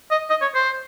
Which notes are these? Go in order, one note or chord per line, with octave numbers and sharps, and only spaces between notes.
D#5
D#5
C#5
C5